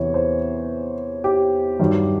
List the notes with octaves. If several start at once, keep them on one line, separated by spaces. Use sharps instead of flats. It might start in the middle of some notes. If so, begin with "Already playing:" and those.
Already playing: E2 C3 E3 C#5
C5
G4
G2 D#3 F#3